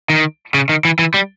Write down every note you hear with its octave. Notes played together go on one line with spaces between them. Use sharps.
D#3
C#3
D#3
E3
E3
G3